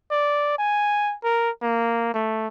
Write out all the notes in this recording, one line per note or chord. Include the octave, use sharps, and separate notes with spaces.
D5
G#5
A#4
A#3
A3